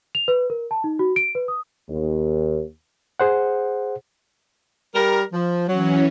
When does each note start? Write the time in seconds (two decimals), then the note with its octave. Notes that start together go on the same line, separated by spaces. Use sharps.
0.15 F7
0.28 B4
0.50 A#4
0.71 A5
0.84 D#4
0.99 F#4
1.16 D7
1.35 B4
1.48 D#6
1.89 D#2
3.20 G#4 C5 F#5
4.95 G3 A#4
5.33 F3
5.68 E3 F#3 C#4